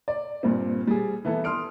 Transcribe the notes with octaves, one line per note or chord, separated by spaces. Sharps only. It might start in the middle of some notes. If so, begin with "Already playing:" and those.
D5
G2 A#2 C4
G3 G#4
E3 B3 E4 A4
C6 D#6 F6 D7